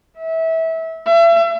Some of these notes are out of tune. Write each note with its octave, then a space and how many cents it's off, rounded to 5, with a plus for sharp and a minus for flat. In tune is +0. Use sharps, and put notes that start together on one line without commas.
E5 -25
E5 +35